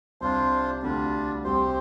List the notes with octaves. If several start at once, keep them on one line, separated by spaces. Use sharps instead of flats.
C2 C3 D4 F4 C5
D2 D3 G3 D4 F4
C2 C3 C4 G4 C5